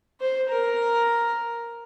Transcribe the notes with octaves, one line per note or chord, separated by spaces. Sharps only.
C5
A#4